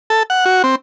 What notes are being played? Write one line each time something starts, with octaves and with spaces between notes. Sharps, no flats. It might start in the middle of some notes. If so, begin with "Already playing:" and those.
A4
F#5
F#4
C4